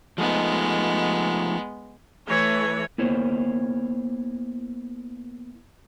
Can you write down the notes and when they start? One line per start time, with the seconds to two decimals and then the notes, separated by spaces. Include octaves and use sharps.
0.18 F3 G#3 A3 B3 D#4
2.27 E3 A3 C#5
2.98 A#3 B3 E4 C5 C#5